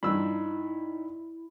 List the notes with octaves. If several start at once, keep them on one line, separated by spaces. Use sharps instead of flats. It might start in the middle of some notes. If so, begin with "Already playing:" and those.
G2 F3 D#4 E4 B5 E6